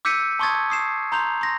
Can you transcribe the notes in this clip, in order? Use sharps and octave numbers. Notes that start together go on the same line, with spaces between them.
D6 E6 G6 B6 C#7 D#7
A5 C6 C#6 D#6 G#6 A6
D#6 C7 E7
A#5 C6 G6 F7
C6 A#6